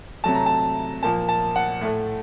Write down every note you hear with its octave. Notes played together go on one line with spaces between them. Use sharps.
C3 F#3 A3 A5
A#5
A5
A#2 F3 A#3 A5
A5
F#5
A2 A3